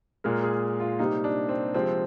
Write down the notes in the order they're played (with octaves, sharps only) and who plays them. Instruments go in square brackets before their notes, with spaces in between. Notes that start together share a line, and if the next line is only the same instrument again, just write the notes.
[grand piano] A#2 G#3 A#4
G#4
F4
C3 G3 A#3 D#4
D4
C4
C3 F3 G#3 C4